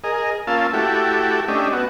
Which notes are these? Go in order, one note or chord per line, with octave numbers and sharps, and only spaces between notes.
G#4 A#4 D#5
A#3 C#4 F4 F5 A5 E6
A3 E4 F#4 G4 A4
A3 C#4 D4 G4 D#5 E5
B3 F#4